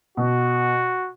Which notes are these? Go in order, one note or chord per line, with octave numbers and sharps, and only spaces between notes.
B2 F#4